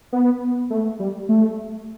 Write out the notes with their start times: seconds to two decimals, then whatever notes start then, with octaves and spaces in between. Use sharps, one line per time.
0.13 B3
0.70 A3
0.99 G3
1.29 A3